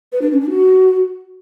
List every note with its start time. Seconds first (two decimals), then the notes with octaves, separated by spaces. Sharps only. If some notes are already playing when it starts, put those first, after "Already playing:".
0.12 B4
0.22 D4
0.31 C#4
0.40 D4
0.50 F#4